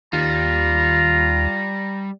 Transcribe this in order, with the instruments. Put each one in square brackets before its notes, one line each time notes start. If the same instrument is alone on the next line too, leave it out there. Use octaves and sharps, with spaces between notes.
[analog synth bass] D#2 [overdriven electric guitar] G3 [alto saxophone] F4 [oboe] A#5